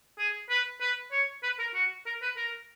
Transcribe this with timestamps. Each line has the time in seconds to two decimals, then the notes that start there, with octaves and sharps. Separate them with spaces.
0.19 G#4
0.50 B4
0.81 B4
1.12 C#5
1.43 B4
1.59 A#4
1.75 F#4
2.06 A#4
2.22 B4
2.37 A#4